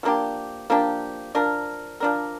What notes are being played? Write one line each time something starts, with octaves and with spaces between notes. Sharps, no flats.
F3 A#3 D4 G4
F3 A#3 D4 G4
F3 D4 A#4
F3 D4 A#4